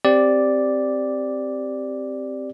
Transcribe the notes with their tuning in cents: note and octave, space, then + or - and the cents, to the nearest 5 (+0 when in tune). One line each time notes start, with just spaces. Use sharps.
C4 +0 G4 +0 D5 +0